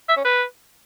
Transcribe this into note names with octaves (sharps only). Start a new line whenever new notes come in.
E5
C#4
B4